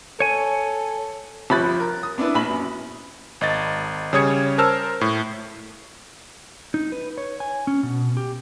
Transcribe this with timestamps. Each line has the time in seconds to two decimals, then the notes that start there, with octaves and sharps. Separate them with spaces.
0.20 A4 C#5 G#5
1.50 G1 F3 B5 F#6 A6
1.80 A#4
2.03 D#6
2.18 B3 D4 E4 B4
2.35 A#1 B5 F#7
2.49 F#2
3.41 G#1 D#5 A6
4.13 C#3 G3 C#5 D#6 G#6 C#7
4.58 A#4 C5 A5 E6 F6
5.01 A2
6.74 D#4
6.92 B4
7.18 C#5
7.40 G#5
7.67 C#4
7.83 B2
8.17 G4